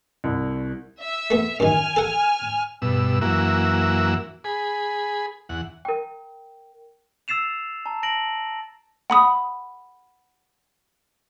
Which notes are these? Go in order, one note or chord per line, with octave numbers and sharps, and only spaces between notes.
C2
E5
A3 B3
F#2 D#3 G#5 F6
A4 F#5
G2 B2 E6
F#2 E3 A#3 F#4 E6
G#4 B5
E2 F#5
A#4 G5
E6 A6 C7 E7 F7
A5 A#5
A5 A#6 D7 F#7
F#5 B5 D#6